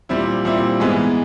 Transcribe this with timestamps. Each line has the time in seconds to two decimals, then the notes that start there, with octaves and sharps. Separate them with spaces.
0.09 A#2 G3 C4 E4
0.45 A#2 G3 C4 E4
0.80 G#2 E3 G#3 B3